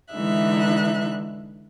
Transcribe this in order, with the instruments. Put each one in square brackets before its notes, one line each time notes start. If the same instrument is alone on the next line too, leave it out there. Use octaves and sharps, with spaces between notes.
[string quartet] D3 E3 G#3 D#4 E5 F#6